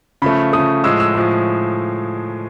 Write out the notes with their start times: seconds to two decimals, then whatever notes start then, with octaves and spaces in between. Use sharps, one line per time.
0.22 C#3 F3 A3 B5
0.53 C#3 F3 A3 D#6
0.84 A2 F3 G#3 E6
1.00 E6
1.15 A2 F3 G#3